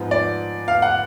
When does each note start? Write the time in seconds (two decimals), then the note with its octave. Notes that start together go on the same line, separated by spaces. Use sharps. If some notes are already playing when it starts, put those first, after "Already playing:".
Already playing: G#2 F3 B3
0.11 D5
0.68 F5
0.82 F#5